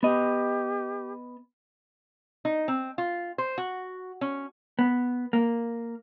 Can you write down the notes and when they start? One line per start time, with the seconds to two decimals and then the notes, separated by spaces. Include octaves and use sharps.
0.03 B3 G4 D#5
2.45 D#4
2.68 C4
2.98 F4
3.38 C5
3.58 F#4
4.21 C#4
4.79 B3
5.33 A#3